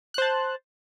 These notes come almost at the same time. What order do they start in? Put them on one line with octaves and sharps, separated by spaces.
F#6 C5 A5